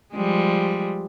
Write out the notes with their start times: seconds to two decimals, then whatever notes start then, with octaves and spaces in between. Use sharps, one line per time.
0.14 F3 G3 G#3